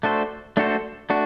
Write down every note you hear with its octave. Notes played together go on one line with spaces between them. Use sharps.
A3 D4 F#4 A4 C5
A3 D4 F#4 A4 C5
A3 D4 F#4